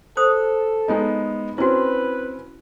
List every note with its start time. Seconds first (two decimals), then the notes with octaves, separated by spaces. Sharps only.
0.17 A4 C5 D#6
0.88 G#3 B3 D#4
1.58 C4 C#4 E4 F#4 B4